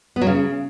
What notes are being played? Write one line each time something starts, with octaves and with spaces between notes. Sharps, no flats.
B3
F#3
C#3